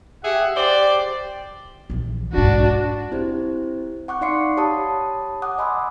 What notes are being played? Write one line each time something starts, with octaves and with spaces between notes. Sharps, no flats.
G4 G#4 E5 F#5
G4 C5 D5
A#1 E3
B1 G#2 D4 F#4
C4 E4 G4 C5
F#5 C#6 D6 F#6
D#4 D5 F5 C6 C7 C#7
G4 C#5 A5 B5 D#6
F#5 D6 D#6 F#6
D#5 G#5 B5 C6 D6 E6